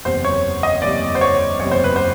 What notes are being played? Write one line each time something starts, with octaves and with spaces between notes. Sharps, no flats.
F#1 E2 C3 C5
C#5
D#5
F#1 E2 C3 D5
C5
C#5
F#1 E2 C3 C#5
C5
B4
C5